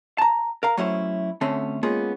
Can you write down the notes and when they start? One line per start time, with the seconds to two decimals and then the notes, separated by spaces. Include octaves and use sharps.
0.18 A5 A#5
0.63 A#4 F5 A#5
0.77 F#3 A3 C#4 E4 C5 C#5
1.41 D2 D3 A3 C4 C#4
1.83 G#3 A#3 B3 C#4 F4 G#4